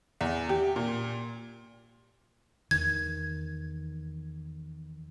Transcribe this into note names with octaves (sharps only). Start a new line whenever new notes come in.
E2
G4
A#2
E2 D#3 G#6